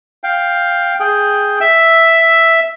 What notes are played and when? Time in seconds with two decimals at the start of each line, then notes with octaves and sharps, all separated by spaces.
0.23 F5 G5
1.00 G#4 G5
1.61 E5 E6